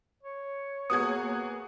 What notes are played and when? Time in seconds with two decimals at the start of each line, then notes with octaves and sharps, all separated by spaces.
0.23 C#5
0.90 A#3 B3 F#4 G#4 D#6 G#6